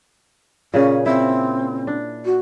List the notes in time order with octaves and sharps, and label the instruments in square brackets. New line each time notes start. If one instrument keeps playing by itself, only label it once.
[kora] A#2 C#3 G#4 [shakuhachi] C#4
[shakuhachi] C4 [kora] E4
[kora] D4
[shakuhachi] F#4